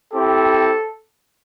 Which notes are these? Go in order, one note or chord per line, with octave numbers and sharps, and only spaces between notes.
C4 E4 G4 A4